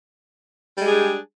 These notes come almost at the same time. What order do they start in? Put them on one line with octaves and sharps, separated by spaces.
G3 G#3 G4 G#4 D4